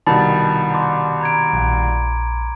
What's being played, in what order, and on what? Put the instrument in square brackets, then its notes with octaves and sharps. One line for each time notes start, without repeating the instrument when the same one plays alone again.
[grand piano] C2 B2 D#3 [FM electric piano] A5 [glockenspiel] B5
[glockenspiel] C6 D6
A#5 G#6 D7
[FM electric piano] A#1